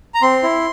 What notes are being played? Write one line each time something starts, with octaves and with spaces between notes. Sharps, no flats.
A#5
C4 C6
E4